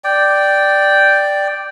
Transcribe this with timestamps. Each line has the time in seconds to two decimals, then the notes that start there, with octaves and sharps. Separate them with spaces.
0.04 D5 G5